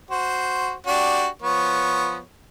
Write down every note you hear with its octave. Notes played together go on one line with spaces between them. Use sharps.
F#4 C5
D4 F#4 G4
F3 B3 C#5